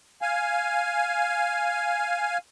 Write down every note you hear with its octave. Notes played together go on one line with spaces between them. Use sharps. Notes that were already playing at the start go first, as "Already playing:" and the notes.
F5 G#5